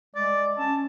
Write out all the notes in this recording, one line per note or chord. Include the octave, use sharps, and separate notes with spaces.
G#3 D5
C#4 A5